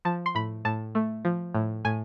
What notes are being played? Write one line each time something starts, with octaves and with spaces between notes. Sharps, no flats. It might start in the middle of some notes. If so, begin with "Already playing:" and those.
F3 A5
C6
A2 B5
A2 A5
A3
F3
A2
A2 G#5